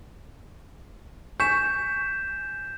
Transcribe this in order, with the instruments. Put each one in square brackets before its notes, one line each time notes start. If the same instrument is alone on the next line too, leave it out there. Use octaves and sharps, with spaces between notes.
[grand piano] G#5 C#6 B6 [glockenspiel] G6 E7